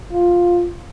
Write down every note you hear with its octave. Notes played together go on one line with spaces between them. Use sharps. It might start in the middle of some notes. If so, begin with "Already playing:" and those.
F4